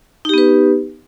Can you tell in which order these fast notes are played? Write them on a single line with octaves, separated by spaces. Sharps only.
D#4 G4 B3 B4